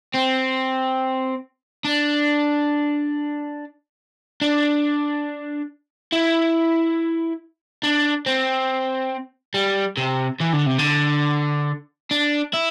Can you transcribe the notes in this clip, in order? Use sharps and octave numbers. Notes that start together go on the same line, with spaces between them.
C4
D4
D4
E4
D4
C4
G3
C3
E3
D3
C3
D3
D4
E4